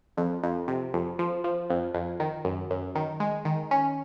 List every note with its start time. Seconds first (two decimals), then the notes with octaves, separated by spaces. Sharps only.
0.17 F2
0.43 F2
0.68 C3
0.93 F2
1.19 F3
1.44 F3
1.70 F2
1.94 F2
2.20 D#3
2.45 F#2
2.70 F#2
2.95 D#3
3.20 G#3
3.45 D#3
3.71 C#4